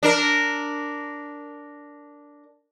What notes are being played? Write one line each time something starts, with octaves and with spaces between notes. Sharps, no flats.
D4 A#4